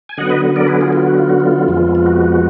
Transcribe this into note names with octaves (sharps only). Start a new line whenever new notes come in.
G#5
D3 F#3 B3 D#5 F#5
B4 D#5
A#4 D5
G#4 B4
F4 G#4
F4
F#4
F4
F#4
F4
F2 F3 G#3 B3
F4
F#4